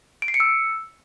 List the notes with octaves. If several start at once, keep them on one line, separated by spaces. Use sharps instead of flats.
D7
C7
C#7
E6